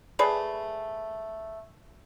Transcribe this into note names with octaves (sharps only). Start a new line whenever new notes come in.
A3 G#4 B4 D5